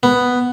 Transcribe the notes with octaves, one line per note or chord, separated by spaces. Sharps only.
B3